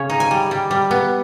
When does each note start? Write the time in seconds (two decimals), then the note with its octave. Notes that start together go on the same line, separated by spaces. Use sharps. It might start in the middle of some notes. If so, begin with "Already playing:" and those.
Already playing: C#3 C#5
0.10 D#4
0.20 G#5
0.31 G3
0.51 G3
0.71 G3
0.91 B3